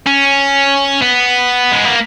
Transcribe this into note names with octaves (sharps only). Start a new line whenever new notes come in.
C#4
B3
G#3
A#3